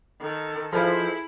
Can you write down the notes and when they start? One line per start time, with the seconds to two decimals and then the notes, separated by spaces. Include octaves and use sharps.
0.21 D#3 A4
0.72 F3 E4 G#4 A4 B4 C5 D#5 F6